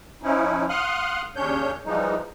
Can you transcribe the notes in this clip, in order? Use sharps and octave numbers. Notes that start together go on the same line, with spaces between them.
F3 C#4 D#4 E4
F5 F#5 C6 D#6 F6 F#6
D#2 C#3 C#4 D4 C#5 G6
E3 F3 G3 G#3 D#4